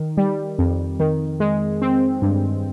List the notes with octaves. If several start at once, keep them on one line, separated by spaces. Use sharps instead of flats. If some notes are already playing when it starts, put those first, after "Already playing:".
Already playing: D#3
G3
F2
D#3
G#3
C4
G2